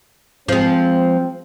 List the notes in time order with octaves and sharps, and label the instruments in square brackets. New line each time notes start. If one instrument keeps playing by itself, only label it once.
[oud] F3 G#3 [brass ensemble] C4